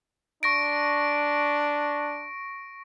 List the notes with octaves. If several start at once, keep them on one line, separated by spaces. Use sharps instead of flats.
D4 C#6 A#6 D7